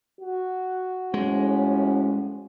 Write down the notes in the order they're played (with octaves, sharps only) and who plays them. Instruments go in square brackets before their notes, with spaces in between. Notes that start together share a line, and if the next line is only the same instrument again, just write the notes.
[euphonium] F#4
[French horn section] F2 A2 C#4 [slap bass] G#3